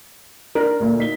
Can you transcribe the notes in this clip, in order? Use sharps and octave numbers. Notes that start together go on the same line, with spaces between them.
D4 A#4
D2 A#2 A3
D#4 B6 G7